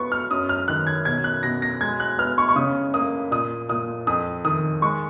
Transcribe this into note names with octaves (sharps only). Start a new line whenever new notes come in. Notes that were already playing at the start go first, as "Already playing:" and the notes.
Already playing: F#3 B3 C#6
F6
F#2 D#6
F6
D#3 F#6
G#6
B2 G#6
F#6
B2 A#6
A#6
G#3 G#6
F#6
B3 F6
C#6
C#6
C#3 D#6
A#3 D#6
A#2 D#6
A#2 D#6
F2 D#6
D#3 D#6
G#3 C#6